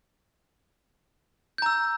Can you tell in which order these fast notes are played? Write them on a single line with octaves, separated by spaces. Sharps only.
G6 A#5 E6